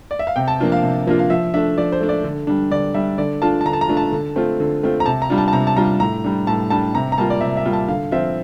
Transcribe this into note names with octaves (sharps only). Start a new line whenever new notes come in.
D5
E5
F5
C3 G5
A5
F3 A#3 D4 F4
F5
C3
F3 A#3 D4 F4
F5
F3 E5
A3 D4 E5
F3 D5
C5
A3 D4
D5
D3
G3 D4
D3 D5
G3 D4 E5
D3 D5
A3 D4 F4 A5
A5
D3 A#5
A5
A#5
A3 D4 F4
A5
D3
A3 C4 F4
D3
A3 C4 F4
A#5
C3 A5
A#5
G3 D4 F4
A5
A5
C3 A#5
A5
G3 D4 F4 A#5
A2 A#5
G3 D4
A2 A5
G3 D4 A5
C3 A#5
A#5
G3 A#3 F4 A5
D5
C3 E5
E5
G3 A#3 F4
A5
D3 F5
F3 C4 F4 E5